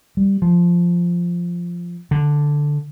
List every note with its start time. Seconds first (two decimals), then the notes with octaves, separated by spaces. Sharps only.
0.17 G3
0.42 F3
2.11 D3